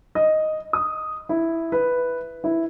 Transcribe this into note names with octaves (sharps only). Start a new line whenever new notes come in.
D#5
D#6
E4
B4
E4